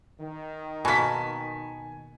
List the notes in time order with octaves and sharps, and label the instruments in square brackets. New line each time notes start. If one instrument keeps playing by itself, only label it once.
[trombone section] D#3
[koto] B2 A#3 [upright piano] G#5 B6 [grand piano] A5 B5 C#6